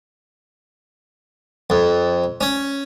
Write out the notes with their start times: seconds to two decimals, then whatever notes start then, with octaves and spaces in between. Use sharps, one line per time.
1.70 F2
2.41 C#4